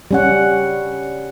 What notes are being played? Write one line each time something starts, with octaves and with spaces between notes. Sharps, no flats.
G3 C#4 F#5